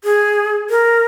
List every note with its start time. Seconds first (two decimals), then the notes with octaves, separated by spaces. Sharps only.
0.04 G#4
0.70 A#4